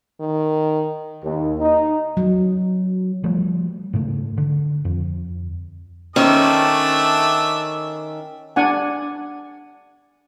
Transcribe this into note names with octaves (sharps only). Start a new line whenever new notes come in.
D#3
D#2
D#4
F#3
E3 F3 G3 A3
G#2 C#3 A3
D3
F2
D#3 A3 C#4 D4 C5 E5
D4 F#5 G#5